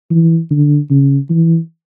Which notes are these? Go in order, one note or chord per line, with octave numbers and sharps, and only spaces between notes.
E3
D3
C#3
E3